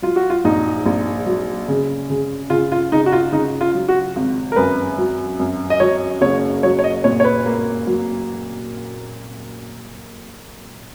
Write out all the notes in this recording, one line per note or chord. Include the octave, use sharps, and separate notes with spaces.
F#3 F4
F#4
F4
A#1 D#4
A#1
F#3
C#3
C#3
C#3 F4
F4
C#3 D#4
F#4
F4
C#3 D#4
F4
F#3
F#4
G#1
A#4
F#2 B4
F#3
F#2
D#5
F#3 C#5
F#1 C#5
F#3 C#5
C#5
D#5
A#2 C#5
C#5
B4
A#3
F#3